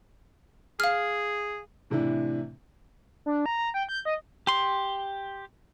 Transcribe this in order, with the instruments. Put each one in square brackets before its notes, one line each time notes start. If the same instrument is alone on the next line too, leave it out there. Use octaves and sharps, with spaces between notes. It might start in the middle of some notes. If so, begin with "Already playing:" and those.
[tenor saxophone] G#4 [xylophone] F5 F6
[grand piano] A2 C3 E3 D4 E4
[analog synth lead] D4
A#5
A#5
G5
G6
D#5
[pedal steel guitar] G4 C6